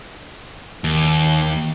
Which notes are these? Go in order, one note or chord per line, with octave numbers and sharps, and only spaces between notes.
D#2